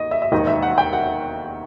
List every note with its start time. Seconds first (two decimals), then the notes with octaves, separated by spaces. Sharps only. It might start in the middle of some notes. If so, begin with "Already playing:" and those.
Already playing: D#2 D#5
0.11 E5
0.22 E5
0.32 E1 D#2 D#3 D#5
0.47 E5
0.62 F#5
0.78 G5
0.93 F#5